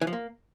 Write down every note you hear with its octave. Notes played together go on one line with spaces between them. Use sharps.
E3
F3
A#3